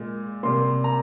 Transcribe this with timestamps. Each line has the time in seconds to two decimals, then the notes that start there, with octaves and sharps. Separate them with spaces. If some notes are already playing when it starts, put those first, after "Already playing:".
Already playing: A#2 G#3
0.43 C3 G3 A#3 C6
0.84 A#5